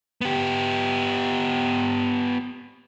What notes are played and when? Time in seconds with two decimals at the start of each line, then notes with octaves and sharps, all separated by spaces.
0.21 B3 G4